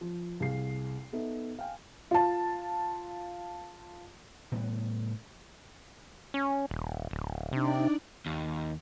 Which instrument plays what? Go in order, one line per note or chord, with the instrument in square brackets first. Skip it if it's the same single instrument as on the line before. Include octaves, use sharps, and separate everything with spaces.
[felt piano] F3
C2 G#4 F5 C7
B3 D#4 A4 E5
F5 G5 G#5
F4 A5
[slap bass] A2 G3 B3
[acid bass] C#4
D#1
D1
[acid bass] C3 [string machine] D4 D#4 D5
[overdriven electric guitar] D#2